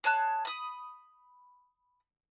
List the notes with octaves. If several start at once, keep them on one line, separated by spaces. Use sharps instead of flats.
G#4 C#5 A5 F#6
B5 D#6